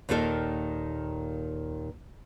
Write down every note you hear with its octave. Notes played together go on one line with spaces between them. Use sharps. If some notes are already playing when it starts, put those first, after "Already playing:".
D#2 A#2 D#3 A4 A#4 D#5